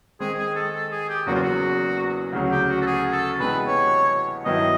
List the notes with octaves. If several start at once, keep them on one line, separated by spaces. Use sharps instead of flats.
D#3 G#3 C4 G#4
G#4
A4
A4
G#4
G4
E2 C#3 F#3 A#3 F#4
F4
F#4
D2 C#3 F#3
G4
F#4
A4
G#4
A4
C3 E3 G#3 B3 D4 B4
C#5
G2 D#3 F#3 B3 E4 D#5